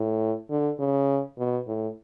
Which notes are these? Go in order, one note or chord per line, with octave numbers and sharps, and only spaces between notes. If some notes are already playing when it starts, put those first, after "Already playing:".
Already playing: A2
D3
C#3
B2
A2